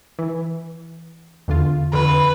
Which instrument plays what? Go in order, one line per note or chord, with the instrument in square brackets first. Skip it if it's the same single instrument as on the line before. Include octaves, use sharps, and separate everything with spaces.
[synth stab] E3
E2 D3 F4
[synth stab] F2 D3 [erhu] B4